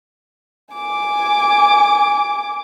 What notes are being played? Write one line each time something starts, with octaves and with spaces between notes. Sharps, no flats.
G#5 D6